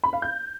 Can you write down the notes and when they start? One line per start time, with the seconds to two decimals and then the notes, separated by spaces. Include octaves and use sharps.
0.04 B5
0.13 F5
0.22 G6